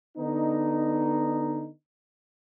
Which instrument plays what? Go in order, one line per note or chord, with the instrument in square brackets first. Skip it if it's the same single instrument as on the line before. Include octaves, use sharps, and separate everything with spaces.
[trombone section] D3 B3 D#4